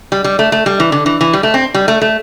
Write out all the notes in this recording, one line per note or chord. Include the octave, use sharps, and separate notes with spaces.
G3
G3
A3
A3
G3
E3
D3
E3
E3
G3
A3
C4
G3
A3
A3